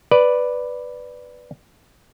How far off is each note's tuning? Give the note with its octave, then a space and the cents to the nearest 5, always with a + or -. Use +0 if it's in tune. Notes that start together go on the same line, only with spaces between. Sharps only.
B4 +0 D5 +0